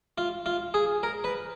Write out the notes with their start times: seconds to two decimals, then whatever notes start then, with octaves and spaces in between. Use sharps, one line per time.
0.18 F4
0.46 F4
0.74 G#4
1.03 A#4
1.24 B4